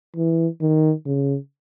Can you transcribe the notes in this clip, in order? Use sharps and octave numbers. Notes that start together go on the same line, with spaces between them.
E3
D#3
C#3